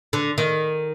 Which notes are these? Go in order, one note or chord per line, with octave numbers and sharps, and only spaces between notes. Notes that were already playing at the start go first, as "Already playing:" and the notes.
D3
D#3